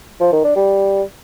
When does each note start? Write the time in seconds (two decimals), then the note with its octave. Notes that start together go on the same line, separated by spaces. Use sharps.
0.20 F3
0.32 D#3
0.44 D4
0.56 G3